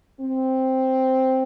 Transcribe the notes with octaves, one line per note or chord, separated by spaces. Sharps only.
C4